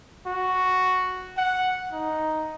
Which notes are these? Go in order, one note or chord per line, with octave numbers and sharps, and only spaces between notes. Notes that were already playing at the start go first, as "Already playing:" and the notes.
F#4
F#5
D#4